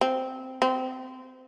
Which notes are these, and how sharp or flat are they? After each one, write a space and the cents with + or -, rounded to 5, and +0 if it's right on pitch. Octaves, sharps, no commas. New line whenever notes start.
C4 -5
C4 -20